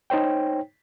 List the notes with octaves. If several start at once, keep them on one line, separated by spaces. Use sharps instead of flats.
D#4 C5 C#5 G5